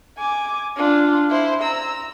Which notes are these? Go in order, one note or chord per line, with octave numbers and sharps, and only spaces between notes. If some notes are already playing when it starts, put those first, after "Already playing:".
G#5 D6
D4 F4
E4 C5
A#5 E6